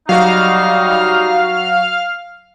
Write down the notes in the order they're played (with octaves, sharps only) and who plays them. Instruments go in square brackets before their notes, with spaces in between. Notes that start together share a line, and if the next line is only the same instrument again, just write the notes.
[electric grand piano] F#3 F#4 [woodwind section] G3 D#4 [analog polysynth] F5 F6